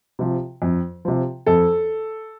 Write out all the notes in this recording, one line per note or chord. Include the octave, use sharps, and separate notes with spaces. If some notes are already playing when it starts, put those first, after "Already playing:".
C3 F3
F2
C3 F3
F2 A4